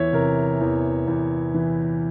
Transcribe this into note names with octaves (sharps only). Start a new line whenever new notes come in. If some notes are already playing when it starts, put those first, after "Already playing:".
Already playing: E2 E3 C#5 E5
C3 A#4
E2
E2
E3